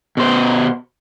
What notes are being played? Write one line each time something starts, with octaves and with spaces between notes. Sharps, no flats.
B2 C5